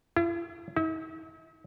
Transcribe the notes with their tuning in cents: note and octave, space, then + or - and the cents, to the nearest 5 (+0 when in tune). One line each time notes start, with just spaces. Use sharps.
E4 +45
E4 -45